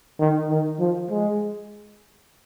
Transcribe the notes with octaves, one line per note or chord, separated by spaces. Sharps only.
D#3
D#3
F3
G#3